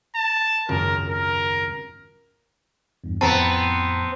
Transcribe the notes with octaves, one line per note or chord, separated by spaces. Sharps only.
A5
G#1 C#2 F#2 A#4
A#4
E2 G2
F2 A2 B3 C4 A5 A#5